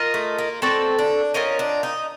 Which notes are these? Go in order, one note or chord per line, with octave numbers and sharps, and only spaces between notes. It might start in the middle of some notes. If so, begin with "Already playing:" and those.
Already playing: F4 A#4 D#5
A3
A#3
C4 F#4 A4 D5
D4
C4 C#4 F4 A#4 D#5
D4
D#4